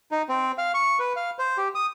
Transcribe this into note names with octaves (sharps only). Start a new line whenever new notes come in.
D#4
C4
F5
C#6
B4
F5
C5
G4
D#6